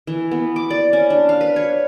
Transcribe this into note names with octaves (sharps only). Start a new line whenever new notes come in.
E3
B3
D6
D5
C#4
D4
F5
B4
C#5